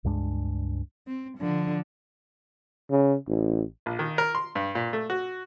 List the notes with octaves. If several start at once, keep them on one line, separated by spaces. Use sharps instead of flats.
C#2 G2 G#3 D4
C4
D3 F3
C#3
A1
A#1
D#3
A#4
C6
G2
A#2
A3
F#4